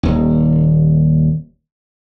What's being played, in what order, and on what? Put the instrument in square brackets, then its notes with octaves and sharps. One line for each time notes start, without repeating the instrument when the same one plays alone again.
[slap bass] D#1 D#2